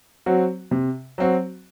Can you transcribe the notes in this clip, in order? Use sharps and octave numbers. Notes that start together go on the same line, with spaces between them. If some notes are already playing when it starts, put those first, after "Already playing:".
F#3 C4 F#4
C3
F#3 C4 F#4